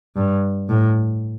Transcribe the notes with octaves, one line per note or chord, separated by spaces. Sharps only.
G2
A2